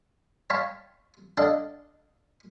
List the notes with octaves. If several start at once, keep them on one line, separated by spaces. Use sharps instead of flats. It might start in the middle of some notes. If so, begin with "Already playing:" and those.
C#5 F5 G5 A5 B5 C#6
D4 A4 D#5 F5 F#5 A5